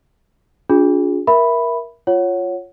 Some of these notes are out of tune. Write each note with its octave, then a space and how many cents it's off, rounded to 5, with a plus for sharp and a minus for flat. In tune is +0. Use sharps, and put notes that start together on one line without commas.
D4 -30 F4 +40 G#4 +0
A#4 +20 E5 +5 B5 +0
F4 +0 C#5 +0 F#5 +0